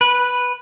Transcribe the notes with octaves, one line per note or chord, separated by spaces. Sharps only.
B4